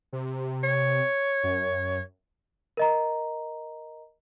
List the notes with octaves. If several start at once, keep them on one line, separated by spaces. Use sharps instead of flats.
C3
C#5
F#2
A#4 D#5 A#5